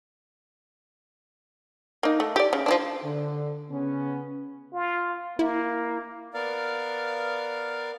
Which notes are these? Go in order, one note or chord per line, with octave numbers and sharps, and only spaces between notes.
A#3 D#4
A3
G4 D5
C#3
F3 B3 D4
D3
C#3 B3 C#4
F4
A#3 E4
B3 A#4 D5 F5